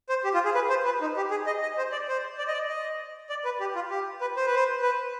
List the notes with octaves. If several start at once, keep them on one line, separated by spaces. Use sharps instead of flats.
C5
G4
F4
G#4
B4
C5
B4
D#4
G4
G#4
D#5
D#5
C5
D5
C5
D5
D#5
D5
D#5
D5
B4
G4
F4
G4
B4
C5
B4
C5
B4